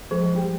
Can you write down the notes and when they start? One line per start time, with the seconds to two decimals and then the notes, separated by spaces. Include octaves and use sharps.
0.11 F3 G#3 G#4
0.35 G3 G4